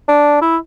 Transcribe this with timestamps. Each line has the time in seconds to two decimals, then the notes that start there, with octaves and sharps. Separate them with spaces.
0.08 D4
0.41 E4